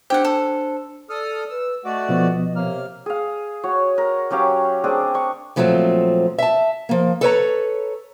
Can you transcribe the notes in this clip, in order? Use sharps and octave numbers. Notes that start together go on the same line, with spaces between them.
D4 G4 C5 F#5
A4
A4 D5 D#6 F6
B4 E6
A3 F#4 D5 D#5
B2 F3 B3
C3 A#3 C#5 F6
G#4 F5
F#4 C#5
A#4
F#3 C#4 G4 F5
C4 D4 G#4 D5
D4 C#6
A#2 F3 F#3 A3 C4
E5 A5
F3 A#3
A4 B4 C#5 A#5